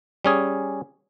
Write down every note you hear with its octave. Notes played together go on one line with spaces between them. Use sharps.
G3 C#4 G#4